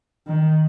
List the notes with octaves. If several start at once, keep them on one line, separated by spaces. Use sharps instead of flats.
D#3